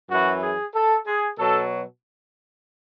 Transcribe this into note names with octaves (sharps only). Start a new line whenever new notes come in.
F#2 E3 F#4
G#4
A4
G#4
B2 F#3 A4